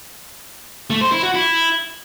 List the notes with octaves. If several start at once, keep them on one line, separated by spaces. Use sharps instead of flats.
A3
C5
E4
F#4
E4